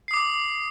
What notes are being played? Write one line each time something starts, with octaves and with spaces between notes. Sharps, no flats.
D6 D#6 C7